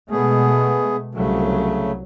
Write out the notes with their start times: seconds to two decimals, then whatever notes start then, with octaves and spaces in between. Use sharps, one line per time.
0.11 B2 G#3 A3 B3 G#4
1.15 C2 C#3 F#3 A3